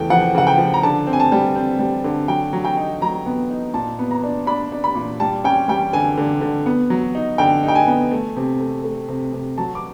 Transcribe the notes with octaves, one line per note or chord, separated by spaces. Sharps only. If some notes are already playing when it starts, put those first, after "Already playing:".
Already playing: E2 C#3 A3 G5
F3 F#5
C#3 F#5
G5
F3
A#5
D3 A5
C4
G#5
A5
G3
C4
G3
D3
F#3 G5
F#3
G5
D#4
F#3 A#5
B3
D#4
A#2 A5
B3
A#5
D4
D4 B5
D4
B5
A#2
G3 A5
C#4 G5
G3 G5
D3 G#5
D3
D3
B3
F#3
D#4
D3 G5
D#4
G5
G#5
B3
A3
C3
A3
A3
C3
C3
F#3 A5
D6